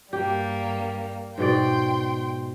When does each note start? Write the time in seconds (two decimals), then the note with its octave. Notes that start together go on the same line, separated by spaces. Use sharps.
0.13 G2 G3 A#3 G4
1.38 G#2 B2 D5 G5 C6